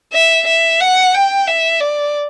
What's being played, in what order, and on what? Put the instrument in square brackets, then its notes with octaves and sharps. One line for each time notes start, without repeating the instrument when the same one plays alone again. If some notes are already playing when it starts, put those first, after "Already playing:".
[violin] E5
E5
F#5
G5
E5
D5